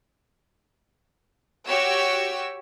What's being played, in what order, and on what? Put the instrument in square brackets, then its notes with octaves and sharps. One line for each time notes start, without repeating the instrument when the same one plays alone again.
[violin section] F#4 G4 C#5 E6